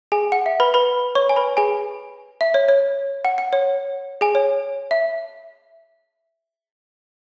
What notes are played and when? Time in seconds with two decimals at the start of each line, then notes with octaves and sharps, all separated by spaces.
0.12 G#4 G#5
0.32 F#5
0.46 E5
0.60 B4 B5
0.74 B4 B5
1.15 C#5 C#6
1.29 G#5
1.36 B4 B5
1.57 G#4 G#5
2.41 E5
2.54 C#5
2.68 C#5
3.25 F#5
3.38 F#5
3.53 C#5
4.21 G#4 G#5
4.35 C#5
4.91 E5